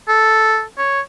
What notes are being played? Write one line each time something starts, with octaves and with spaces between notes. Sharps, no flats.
A4
C#5